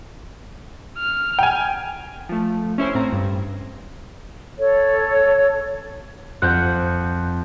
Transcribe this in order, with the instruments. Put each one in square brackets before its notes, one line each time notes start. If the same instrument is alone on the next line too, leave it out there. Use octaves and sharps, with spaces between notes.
[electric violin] F6
[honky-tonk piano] G5 G#5
[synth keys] F3 A3
C#4 E4 C5 G#5
A2 C4 A#5
G2
[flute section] A4 C#5
[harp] F2 F#5 [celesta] F#6 G6